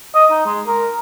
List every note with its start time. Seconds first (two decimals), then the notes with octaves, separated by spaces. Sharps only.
0.15 D#5
0.31 D#4
0.46 G#3
0.66 A#4